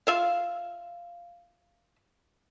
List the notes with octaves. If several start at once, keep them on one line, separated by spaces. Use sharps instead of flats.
F4 E5 F5